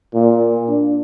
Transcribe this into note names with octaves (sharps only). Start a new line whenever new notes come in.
A#2
D4